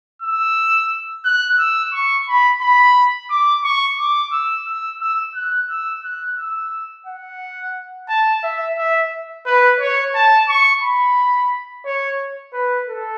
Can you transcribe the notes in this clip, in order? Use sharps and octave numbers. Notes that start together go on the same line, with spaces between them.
E6
F#6
E6
C#6
B5
B5
D6
C#6
D6
E6
E6
E6
F#6
E6
F#6
E6
F#5
A5
E5
E5
B4
C#5
A5
C#6
B5
C#5
B4
A4